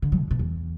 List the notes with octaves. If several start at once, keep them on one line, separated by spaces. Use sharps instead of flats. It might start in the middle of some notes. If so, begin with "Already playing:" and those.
D3
F#3
B2
B2
E2